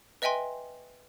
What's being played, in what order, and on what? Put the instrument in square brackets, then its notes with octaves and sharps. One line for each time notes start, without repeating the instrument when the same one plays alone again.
[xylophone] B4 D#5 E5 G5 G#5 C6